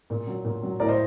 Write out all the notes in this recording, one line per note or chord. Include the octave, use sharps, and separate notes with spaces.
A#2
F#3
A#2
F#3
A2 A#4 D5
C5 D#5